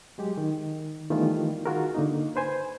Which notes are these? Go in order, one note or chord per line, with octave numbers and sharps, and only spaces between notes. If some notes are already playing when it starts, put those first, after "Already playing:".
F#3 G#3 G4
D#3
D#3 E3 G3 A3 B3 F4
D#3 F4 F#4 G#4 A#4
D3 A#3 D#4
B4 C5 G#5